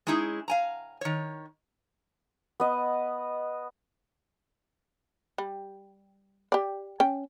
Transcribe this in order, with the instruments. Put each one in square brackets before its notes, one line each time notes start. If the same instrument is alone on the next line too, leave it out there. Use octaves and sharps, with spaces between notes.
[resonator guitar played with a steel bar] G#3 C#4 D#4 E4 G#4
F5 G#5 A#5
D#3 C#5
[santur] B3 D#5
[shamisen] G3
G4 D5
C#4 G5